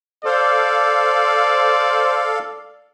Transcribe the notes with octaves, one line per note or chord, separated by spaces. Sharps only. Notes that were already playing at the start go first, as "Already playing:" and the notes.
A4 C5 D5 F5